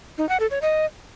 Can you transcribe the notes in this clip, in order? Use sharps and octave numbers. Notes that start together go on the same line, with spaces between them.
D#4
F#5
A4
C#5
D#5